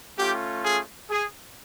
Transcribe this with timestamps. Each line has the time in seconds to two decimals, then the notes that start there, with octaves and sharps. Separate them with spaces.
0.17 A3 C#4 F4 G4
0.63 G#4
1.10 G#4